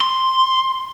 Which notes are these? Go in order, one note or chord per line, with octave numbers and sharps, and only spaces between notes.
C6